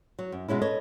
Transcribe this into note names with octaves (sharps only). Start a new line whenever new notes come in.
F#3
F#2
B2 G#3 C#4 E4
A4 B4 C#5 D#5